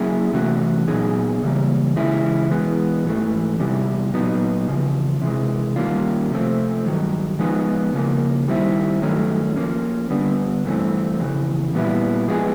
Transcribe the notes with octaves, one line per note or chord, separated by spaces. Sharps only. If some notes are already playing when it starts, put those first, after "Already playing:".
Already playing: F#3 A#3 C#4 E4 G#4
C3 E3 A3 C#4 F#4
A#2 F#3 B3 D#4 G#4
C#3 E3 G3 A#3
C#3 E3 G#3 C#4 E4
E3 G#3 B3
G#2 E3 A3
E2 C3 E3 G3
A#2 F#3 B3 D#4
E2 C#3 F3
C3 E3 G#3
D#3 G3 A#3 C#4 F4
C3 F3 A3 C4
G2 D#3 F#3
F3 G#3 B3 D#4
C#3 F3 A#3
D#3 G3 C4 E4
G2 D#3 F#3 A3 C#4
F3 A#3 C#4
D3 G3 B3 D4
G2 E3 A3 C4
F2 C#3 E3
A#2 G3 B3 E4
F3 G#3 B3 E4 G#4